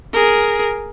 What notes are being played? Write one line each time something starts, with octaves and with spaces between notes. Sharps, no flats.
G#4 A#4